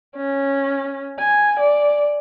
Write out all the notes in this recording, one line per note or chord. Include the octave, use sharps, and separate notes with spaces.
C#4
G#5
D5